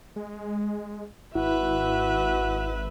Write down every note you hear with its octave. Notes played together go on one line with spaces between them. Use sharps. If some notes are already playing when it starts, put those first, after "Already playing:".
G#3
G#1 E4 F#4 B4 E5